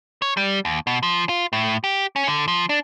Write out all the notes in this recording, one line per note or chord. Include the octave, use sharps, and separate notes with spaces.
C#5
G3
D#2
B2
F3
F4
A2
G4
C#4
D3
F3
D4